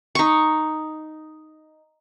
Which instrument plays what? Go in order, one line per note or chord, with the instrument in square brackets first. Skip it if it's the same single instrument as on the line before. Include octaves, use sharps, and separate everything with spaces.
[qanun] D#4 C#6